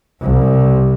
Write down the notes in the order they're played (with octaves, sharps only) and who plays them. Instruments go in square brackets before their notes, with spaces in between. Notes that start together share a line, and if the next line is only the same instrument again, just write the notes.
[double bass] C2